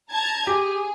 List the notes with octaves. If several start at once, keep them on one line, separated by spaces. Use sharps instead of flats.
A5 A#5 G#6
G4 G#4